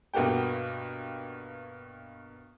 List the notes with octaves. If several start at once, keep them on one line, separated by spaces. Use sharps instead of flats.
G2 B2 A#3 F#4 G4 G5